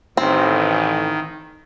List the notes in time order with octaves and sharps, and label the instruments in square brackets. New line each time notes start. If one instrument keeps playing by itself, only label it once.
[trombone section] A1 [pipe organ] D#3 [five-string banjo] C4